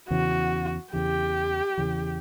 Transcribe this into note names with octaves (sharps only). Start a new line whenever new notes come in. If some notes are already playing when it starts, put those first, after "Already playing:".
E2 C#3 E3 F#4
E2 C#3 E3 G4
E2 C#3 E3